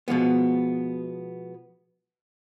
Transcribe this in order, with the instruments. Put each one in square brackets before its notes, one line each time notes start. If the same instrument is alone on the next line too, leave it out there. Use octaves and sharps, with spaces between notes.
[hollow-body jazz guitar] B2 F3 G#3 B3